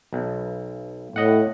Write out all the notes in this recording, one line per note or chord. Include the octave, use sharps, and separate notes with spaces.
B1
A2 D#5 F#5